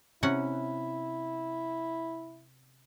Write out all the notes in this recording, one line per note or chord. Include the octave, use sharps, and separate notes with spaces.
C3 C#4 E4 F#5